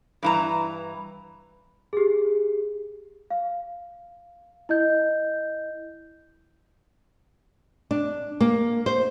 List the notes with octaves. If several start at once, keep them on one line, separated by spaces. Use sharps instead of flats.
G2 E3 A#5
G4 G#4
F5
E4 D#5 G6
D4
A#3
C5